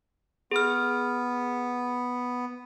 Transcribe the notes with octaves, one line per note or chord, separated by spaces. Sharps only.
B3 G#4 F6